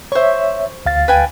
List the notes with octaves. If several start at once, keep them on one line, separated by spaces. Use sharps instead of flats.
C5 C#5 E5 C#6
D2 F5 A6
B4 G5 G#5